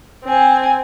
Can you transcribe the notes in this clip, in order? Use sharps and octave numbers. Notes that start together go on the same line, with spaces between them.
C4 G#5